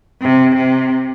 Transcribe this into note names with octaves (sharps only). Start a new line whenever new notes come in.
C3
C3